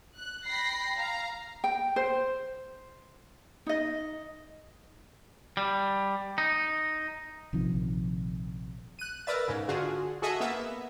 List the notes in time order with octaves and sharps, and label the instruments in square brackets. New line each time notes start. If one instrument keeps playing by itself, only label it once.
[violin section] F#6
G5 B5 A#6 C7
F5 A#5
[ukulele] G5
C5
D#4 D#5
[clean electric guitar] G3
D#4
[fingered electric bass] A#1 C3 D#3 F3
[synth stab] F#6 D#7
A#4 B4 D5 E5 A6
G#2 C#3
D3 F4 F#4 G#4
F#4 G#4 A4 D#5 E5
A#3 B3 E5